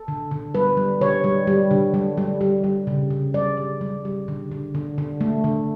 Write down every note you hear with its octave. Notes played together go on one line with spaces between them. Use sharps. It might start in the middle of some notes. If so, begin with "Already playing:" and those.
Already playing: A4
D3
D3
G3 B4
G3
D3 C#5
G3
G3
D3
G3
G3
G3
G3
C#3
C#3
G3 D5
G3
G3
G3
D3
D3
D3
D3
A3
D3